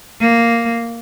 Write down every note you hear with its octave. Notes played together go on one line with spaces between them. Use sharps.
A#3